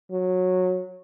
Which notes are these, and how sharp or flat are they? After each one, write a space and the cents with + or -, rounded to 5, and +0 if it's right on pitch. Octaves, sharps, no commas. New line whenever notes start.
F#3 -15